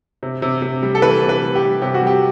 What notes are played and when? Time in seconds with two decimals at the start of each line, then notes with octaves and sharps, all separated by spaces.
0.23 C3
0.42 C3
0.62 C3
0.82 G3
0.95 A4
1.02 E3 B4
1.22 C3
1.29 B4
1.42 G3
1.55 G4
1.62 G3
1.82 C3 G4
1.94 F#4
2.02 G3
2.07 G4